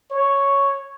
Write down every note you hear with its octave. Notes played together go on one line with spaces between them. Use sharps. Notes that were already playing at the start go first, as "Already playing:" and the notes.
C#5